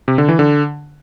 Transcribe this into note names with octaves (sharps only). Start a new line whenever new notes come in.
C3
D3
E3
D3